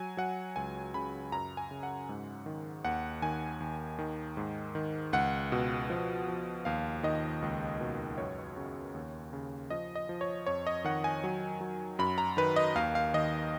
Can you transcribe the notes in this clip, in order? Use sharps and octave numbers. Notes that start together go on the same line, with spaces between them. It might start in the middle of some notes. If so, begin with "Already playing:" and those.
Already playing: F#3 G#5
F#3 F#5
C#2 G#5
C#3 B5
F#2 A#5
G#5
C#3
F#5
G#2
D#3
D#2 F#5
D#3 G#5
D#2
D#3
G#2
D#3
C#2 F#5
B2
F3
F3
D#2 F5
D#3 D#5
C#2
B2
F#2 C#5
C#3
D#2
C#3
F3 D#5
D#5
F3
C#5
F2 C#5
D#5
D#3 F#5
G#5
F#3
F#3
F#2 B5
A#5
D#3 B4
D#5
D#2 F5
F5
D#3 D#5